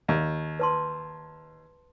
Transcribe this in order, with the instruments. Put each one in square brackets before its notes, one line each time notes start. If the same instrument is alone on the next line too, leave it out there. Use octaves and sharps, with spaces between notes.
[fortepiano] D#2
[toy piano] B4 A5 C6